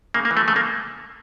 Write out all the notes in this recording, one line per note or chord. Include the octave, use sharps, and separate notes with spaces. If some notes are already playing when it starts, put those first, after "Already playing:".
C#3 A#3
A#3
E3
A3
C#3 A3
A#3